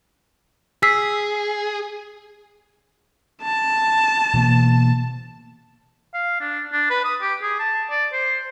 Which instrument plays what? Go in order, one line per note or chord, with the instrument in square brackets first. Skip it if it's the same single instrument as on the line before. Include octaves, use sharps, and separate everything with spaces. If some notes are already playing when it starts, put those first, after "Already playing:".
[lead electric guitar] G#4 [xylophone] E6 B6 C7
[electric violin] A5
[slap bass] B2 E3 A#3
[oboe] F5
D4
D4
B4
D#6
G4
G#4
A5
D5
C5